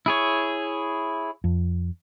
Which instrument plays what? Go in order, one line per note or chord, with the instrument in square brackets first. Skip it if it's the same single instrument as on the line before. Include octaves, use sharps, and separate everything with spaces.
[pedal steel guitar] E4 G#4 C#5
[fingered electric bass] F2